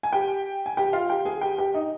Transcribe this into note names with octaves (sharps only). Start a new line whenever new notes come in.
G#5
G4 G5
G#5
G4 G5
F4 F5
G4 G5
G#4 G#5
G4 G5
G4 G5
D#4 D#5